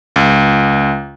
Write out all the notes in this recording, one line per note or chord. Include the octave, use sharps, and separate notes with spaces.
C#2